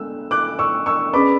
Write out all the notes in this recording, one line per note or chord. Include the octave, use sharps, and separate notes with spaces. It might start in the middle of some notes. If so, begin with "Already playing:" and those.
Already playing: G#3 B3 D4 A4 E6
D6 F#6
C#6 E6
C#6 E6
C#4 G#4 B4 D5 B5 D6